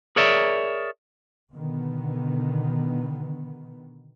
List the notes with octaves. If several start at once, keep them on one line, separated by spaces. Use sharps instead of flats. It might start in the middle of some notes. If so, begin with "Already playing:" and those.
G#4 A#4 C#5 D5 E5
B2 D3 D#3 B3